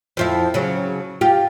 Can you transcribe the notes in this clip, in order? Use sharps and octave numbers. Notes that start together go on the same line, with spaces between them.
F2 F3 E4
C#3 F#3
F4 G4